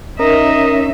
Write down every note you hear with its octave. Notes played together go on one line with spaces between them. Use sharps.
C#4 D#4 A#4 D#5 E5